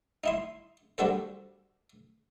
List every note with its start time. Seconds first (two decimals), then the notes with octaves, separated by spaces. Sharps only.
0.24 D#4 E4 C6
0.98 G3 D4 F#4 A4 C5